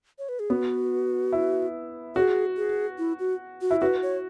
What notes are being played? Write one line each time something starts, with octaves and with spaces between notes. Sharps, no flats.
C#5
B4
G#4
B3 F#4
E4
F#4 G#4
G#4
E4
F#4
F#4
E4
F#4 B4
C#5